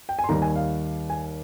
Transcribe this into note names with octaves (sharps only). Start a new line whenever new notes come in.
G5
G#5
C6
D#2 D#3 G3 A#5
G#5
F5
G#5